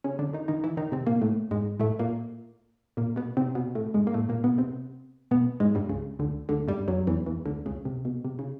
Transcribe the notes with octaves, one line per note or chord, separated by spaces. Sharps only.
C#3 C#4
D3 D4
D#3 D#4
D#3 D#4
E3 E4
D#3 D#4
C3 C4
A#2 A#3
A2 A3
G#2 G#3
A2 A3
A#2 A#3
A#2 A#3
B2 B3
C3 C4
B2 B3
A2 A3
G#2 G#3
A#3
A2 A3
A#2 A#3
B2 B3
C3 C4
B2 B3
G#2 G#3
G2 G3
C#2 C#3
D2 D3
D2 D3
G2 G3
F#2 F#3
E2 E3
E2 E3
D2 D3
C#2 C#3
C3
B2
C3
C#3